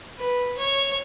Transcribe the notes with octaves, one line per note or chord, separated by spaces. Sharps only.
B4
C#5